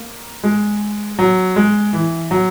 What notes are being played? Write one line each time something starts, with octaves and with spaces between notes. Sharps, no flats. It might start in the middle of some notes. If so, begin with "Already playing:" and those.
Already playing: A#3
G#3
F#3
G#3
E3
F#3